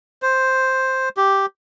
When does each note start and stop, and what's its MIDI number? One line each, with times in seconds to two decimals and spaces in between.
0.22 1.09 72
1.17 1.46 67